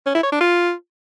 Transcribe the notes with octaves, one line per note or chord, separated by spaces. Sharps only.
C#4
E4
C#5
D4
F4